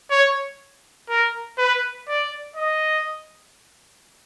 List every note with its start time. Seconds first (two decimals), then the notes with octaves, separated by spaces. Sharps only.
0.10 C#5
1.09 A#4
1.58 B4
2.08 D5
2.56 D#5